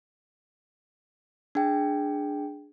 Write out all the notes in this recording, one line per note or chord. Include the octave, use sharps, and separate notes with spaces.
D4 G#4 G5